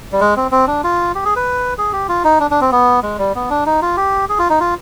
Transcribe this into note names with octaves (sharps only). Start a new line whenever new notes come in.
G3
G#3
C4
C4
D4
F4
G4
G#4
B4
G#4
G4
F4
D#4
D4
D4
C4
B3
G#3
G3
B3
D4
D#4
F4
G4
G#4
F4
D#4
F4